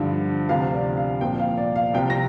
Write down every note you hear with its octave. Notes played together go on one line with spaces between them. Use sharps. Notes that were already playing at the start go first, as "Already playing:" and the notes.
Already playing: G2 D3 F3
D2 C3 F3 F5
D5
F5
C2 A#2 F3 G5
F5
D5
F5
C2 C3 F3 G5
A#6